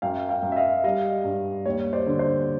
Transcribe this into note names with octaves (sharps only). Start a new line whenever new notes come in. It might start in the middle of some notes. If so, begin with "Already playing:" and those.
F#2 F5 G5
F5 G5
F#2
E5
D#5 F5
G3 D#5 F5
G2
D#2 C#5
C5 D5
D3
C5